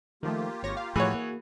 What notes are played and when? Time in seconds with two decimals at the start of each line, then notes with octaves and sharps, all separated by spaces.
0.23 D#3 F3 A3 A#3 F4 G4
0.63 G#1 C#5 A#6
0.77 F5
0.96 A2 E3 F3 A3 F#4 G#4 C#5
1.14 A#3